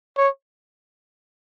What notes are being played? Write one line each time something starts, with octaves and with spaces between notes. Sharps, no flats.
C#5